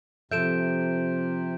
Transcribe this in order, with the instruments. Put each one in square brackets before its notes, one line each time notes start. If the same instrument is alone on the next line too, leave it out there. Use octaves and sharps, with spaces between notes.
[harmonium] C3 [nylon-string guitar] F3 A4 E5 [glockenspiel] G6 D7 E7